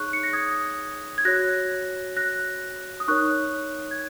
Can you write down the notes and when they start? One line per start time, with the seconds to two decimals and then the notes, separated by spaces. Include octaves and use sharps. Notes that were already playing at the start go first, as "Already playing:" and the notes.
Already playing: D#4 G#4 C#5 C#6 F#6
0.13 C#7
0.23 A#6
0.33 D#6 G#6
1.18 G#6
1.25 F#4 C#5 F#6 A#6
2.17 F#6 A#6
3.00 D#6
3.08 D#4 A#4 C#5 C#6 F#6
3.91 G#6